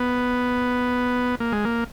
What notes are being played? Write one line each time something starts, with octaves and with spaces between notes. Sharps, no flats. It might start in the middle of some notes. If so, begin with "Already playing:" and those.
Already playing: B3
A#3
G#3
A#3